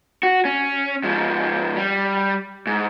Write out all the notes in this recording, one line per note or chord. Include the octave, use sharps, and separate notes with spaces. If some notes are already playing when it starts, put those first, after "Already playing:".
F#4
C#4
G#2 F3
G3
G#2